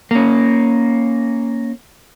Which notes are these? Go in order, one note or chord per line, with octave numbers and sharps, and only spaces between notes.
A#3 C#4